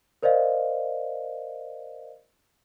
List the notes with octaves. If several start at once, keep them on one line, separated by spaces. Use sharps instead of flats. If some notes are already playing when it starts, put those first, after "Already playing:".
A#4 C5 D5 D#5 F5